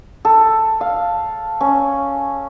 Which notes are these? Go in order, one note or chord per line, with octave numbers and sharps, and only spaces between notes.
A4
F5
C#4